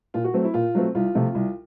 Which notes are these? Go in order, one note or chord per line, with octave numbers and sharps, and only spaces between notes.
A#2 F4
F#4
F#3 A3 C4
E4
A#2 F4
F#3 A3 C4
C2 F4
C3 F3 A3
C2